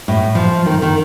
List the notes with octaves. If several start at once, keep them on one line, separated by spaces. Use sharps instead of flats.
A2
F3
D#3
D#3